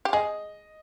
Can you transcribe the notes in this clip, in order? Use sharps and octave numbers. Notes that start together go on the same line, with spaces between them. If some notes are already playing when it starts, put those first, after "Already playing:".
G4
G#4 D#5